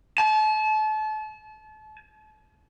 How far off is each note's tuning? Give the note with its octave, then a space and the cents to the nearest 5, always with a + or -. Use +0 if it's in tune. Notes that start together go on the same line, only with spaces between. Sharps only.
A5 -35